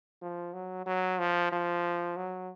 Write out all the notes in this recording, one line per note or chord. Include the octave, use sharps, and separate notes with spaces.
F3
F#3
F#3
F3
F3
F#3